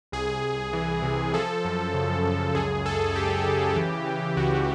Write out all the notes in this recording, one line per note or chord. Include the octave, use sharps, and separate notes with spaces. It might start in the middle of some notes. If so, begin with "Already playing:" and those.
C2 G#4
C2
E3
C3
F3 A4
F#2
C#3
F#2
C#2 G#4
C#2 A4
C#2 G4
C#3
E3
E3
C#2 F#4